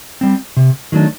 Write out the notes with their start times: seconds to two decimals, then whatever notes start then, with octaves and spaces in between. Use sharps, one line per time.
0.21 G3 C4
0.57 C3
0.92 D#3 F#3 A3 D4